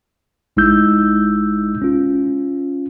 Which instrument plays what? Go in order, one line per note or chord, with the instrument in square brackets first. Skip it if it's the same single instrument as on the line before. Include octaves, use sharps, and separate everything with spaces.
[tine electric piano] A#1 G#3 D#4 E4 E6 G6
C#4 F4